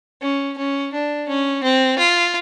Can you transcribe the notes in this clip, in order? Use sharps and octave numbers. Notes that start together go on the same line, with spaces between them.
C#4
C#4
D4
C#4
C4
F4